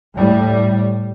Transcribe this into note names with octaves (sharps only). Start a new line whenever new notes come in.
A2 G3